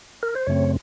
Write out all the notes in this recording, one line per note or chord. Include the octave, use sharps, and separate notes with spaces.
A#4
C5
F#2 C#3 A3 C4 C#5